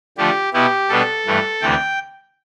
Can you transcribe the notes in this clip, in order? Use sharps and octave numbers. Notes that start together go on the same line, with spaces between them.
D3 F3 A3 G4
B2 B3 E4 G4
B2 G3 B3 D4 A4
G2 E3 A3
D2 C3 E3 A3 G5